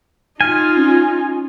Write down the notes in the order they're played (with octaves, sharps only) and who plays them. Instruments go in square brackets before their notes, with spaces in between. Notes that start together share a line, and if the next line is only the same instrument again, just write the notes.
[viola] D#4 F4 [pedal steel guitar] G#5 [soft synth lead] F6
[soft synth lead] C#4